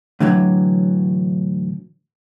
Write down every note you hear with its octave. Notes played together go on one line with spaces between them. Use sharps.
A2 D3 E3 F#3